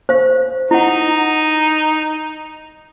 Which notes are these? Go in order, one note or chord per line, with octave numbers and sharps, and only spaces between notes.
C5 F5
D#4 E4 F#5